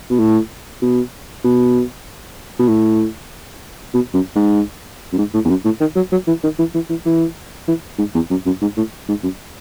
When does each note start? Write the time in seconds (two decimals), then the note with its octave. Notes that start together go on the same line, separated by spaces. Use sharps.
0.10 B2
0.19 A2
0.82 B2
1.44 B2
2.59 B2
2.68 A2
3.94 B2
4.14 F#2
4.35 G#2
5.13 F#2
5.18 G#2
5.34 A2
5.45 E2
5.49 F#2
5.65 A2
5.81 D#3
5.96 F#3
6.12 F#3
6.27 E3
6.43 D#3
6.59 E3
6.74 E3
6.90 E3
7.05 E3
7.68 E3
7.98 G#2
8.14 E2
8.30 F#2
8.46 F#2
8.61 G#2
8.77 A2
9.08 G#2
9.23 F#2